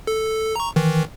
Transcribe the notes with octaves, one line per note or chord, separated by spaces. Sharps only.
A4
A#5 C#6
D#3 E3